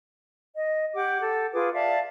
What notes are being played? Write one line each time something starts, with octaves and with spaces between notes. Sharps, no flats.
D#5
G4 F#5 D6
A4
F4 G#4 B4 D6
D5 E5 F5 A5